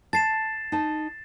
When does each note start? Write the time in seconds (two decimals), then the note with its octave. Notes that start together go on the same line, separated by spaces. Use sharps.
0.13 A5 A6 C7 E7
0.72 D#4 A5